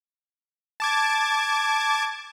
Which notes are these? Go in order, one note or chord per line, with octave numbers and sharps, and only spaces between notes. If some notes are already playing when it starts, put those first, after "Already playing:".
A5 D6 G#6